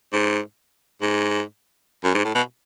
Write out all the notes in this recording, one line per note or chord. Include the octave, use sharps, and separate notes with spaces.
G#2
G#2
F#2
G#2
A2
B2